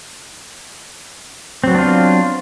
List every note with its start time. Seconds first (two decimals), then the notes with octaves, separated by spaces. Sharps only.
1.64 C4
1.67 F#3
1.71 B3
1.75 D4
1.78 F4